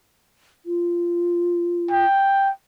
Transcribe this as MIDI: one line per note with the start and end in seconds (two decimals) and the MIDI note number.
0.66 2.05 65
1.91 2.50 79